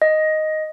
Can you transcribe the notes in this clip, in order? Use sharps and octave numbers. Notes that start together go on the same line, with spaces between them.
D#5